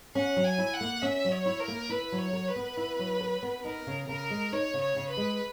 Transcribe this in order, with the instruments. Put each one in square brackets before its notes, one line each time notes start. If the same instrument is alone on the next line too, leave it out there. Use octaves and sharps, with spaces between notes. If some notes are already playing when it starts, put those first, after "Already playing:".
[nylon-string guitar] C#4 [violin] F#5
[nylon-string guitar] F#3
[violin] G#5
[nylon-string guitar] E4
[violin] F#5
[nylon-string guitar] A#3
[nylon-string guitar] C#4 [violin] E5
[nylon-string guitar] F#3
[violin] C#5
[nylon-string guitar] E4
[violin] A#4
[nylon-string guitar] A#3
[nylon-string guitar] E4 [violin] B4
[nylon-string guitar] F#3
[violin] C#5
[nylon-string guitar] A#4
[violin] B4
[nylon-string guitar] B3
E4
F#3
A#4
B3
[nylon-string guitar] D#4 [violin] A#4
[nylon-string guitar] C#3
[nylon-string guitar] C#3 [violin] A#4
[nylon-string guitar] G#3
[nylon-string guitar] D#4 [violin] C#5
[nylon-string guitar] C#3
[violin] C#5
[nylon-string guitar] C#3
[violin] B4
[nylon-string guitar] G#3